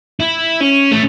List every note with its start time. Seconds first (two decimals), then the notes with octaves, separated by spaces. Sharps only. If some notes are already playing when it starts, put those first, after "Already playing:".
0.20 E4
0.61 C#4
0.91 A3